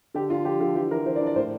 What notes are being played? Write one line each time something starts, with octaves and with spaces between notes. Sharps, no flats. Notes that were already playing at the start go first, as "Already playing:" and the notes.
D3 G4
D3 F4
F3 G4
D3 F4
E3 G4
E3 A#4
E3 C5
D5
D4
D5
A2 C5